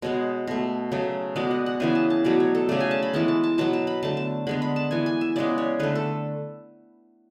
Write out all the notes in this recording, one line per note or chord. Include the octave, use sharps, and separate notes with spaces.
B2 G#3 B3 C#5
B2 A3
C#3 F#3 A3
B2 G#3 B3 D5
F#5
F#5
C#3 E3 B3 G#5
A5
A5
B2 F#3 A3 D5
C#5
A4
C#3 F#3 A3 D5
G#5
A5
B5
E3 G#3 B3 A5
A5
A5
B2 F#3 B3 A5
A5
B5
D3 A3 A5
A5
D3 G#3 B3 B5
B5
A5
E3 B3 G#5
G#5
E5
C#3 G#3 B3 D5
C#5
D3 A3 B4
A4